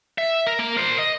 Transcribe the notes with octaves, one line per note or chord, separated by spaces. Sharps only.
E5
A#4
A#3 A#5
A#4 C5
D#5